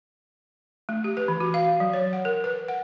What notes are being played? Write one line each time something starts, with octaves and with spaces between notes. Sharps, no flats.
A3
G4
B4
E3
F#4
F5
F#3
C#5
F#5
A#4
B4
F#5